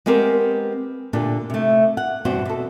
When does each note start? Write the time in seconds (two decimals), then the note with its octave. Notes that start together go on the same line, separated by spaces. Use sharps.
0.06 G#3 B3 C4 G4 A#4
1.13 A#2 D3 D4 G4
1.50 C3 A3
1.97 F#5
2.25 E2 G2 B2 C4 F#4 C5
2.45 B2 A4